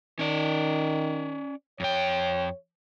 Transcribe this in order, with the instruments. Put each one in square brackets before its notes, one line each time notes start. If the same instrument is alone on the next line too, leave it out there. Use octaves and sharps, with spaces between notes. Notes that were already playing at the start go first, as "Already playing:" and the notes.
[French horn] D#3 [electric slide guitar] C#4 D5
[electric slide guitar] F2 G5 [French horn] C#5